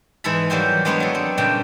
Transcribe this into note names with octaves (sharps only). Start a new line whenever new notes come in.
G#2 E3 G#3 A4 E5 B5
F#3 G3 A#3 G4 C5 C6
F#3 G#3 B3 D4 G4 C#5
F#3 A4
C4
G2 A#2 C#3 G5